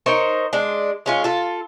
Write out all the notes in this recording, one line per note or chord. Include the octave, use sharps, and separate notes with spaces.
D#4 A#4 C5 C#5
G#3 D4
G#3 C#4 F4
F4 A4